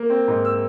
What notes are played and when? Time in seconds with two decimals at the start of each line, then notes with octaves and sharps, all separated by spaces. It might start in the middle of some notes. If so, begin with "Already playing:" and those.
Already playing: A#3
0.10 C4
0.28 G#2
0.45 E6